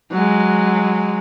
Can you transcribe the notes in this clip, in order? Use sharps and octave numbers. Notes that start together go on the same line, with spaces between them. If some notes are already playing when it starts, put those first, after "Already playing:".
F#3 G#3